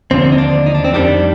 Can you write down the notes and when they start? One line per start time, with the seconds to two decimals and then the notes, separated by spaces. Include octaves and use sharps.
0.11 D#2 D3 F3 C4
0.32 D#4
0.38 D4
0.66 D#4
0.75 D4
0.85 C4
0.93 F2 D#3 G3 D4